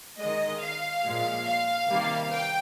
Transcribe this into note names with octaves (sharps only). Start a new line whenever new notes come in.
D#3 G#3 D#5
F5
A#2 F3 G#3
F5
C3 D#3 G3 A#3
G5